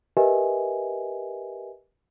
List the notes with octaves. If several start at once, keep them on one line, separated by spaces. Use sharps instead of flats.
G4 A#4 B4 D#5 E5 G#5